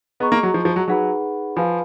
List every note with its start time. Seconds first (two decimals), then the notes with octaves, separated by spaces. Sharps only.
0.20 B3 G#4 D#5 A#5 C#6
0.32 A#3
0.43 F#3
0.54 F3
0.65 F3
0.76 F#3
0.88 F#3 D#4 G#4 B4 F#5 B5
1.56 F3 B4 F5 G#5 B5